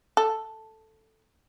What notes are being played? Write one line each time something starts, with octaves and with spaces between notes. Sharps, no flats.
A4